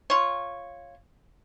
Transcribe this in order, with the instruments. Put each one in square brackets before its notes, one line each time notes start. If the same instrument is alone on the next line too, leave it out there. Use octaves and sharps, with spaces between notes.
[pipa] F4 C#5